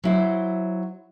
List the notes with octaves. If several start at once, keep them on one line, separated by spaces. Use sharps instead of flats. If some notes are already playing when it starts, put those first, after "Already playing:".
F#3 E4 C5